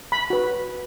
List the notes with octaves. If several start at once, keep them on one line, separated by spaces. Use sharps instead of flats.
B5
F#4 B4